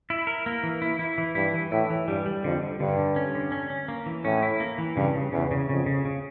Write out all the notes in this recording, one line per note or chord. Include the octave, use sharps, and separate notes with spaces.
E4
A#4
A#3
E3
E4
E4
E3
G2 E4
E3
A2 E4
E3
G2 G3
G3
F2 D3
D3
G2 D3
D3
C#4
D3
C#4
C#4
A#3
E3
A2 C#4
E4
A#3
E3
G2 C#3
C#3
E2 C#3
C#3
F2 C#3
C#3
C#3